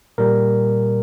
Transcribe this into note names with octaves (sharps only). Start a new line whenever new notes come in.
A#2 G3 A#4